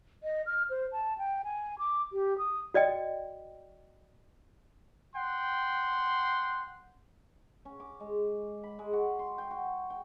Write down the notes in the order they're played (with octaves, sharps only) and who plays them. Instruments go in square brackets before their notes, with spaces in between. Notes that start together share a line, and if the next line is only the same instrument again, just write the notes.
[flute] D#5
F6
C5
A5
G5
G#5
D6
G4
D#6
[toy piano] F#4 D5 D#5 G5
[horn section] F#5 G5 C6
[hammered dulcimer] C#4
D6
G#3
B5
G#3
F#4
C6
G5
F#4
G5